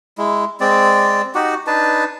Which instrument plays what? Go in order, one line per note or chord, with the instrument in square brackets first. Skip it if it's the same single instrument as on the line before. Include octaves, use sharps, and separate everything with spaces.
[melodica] G#3 E4
G#3 C4 D5
D#4 F#4 G4 F#5
D4 D#4 B4 A5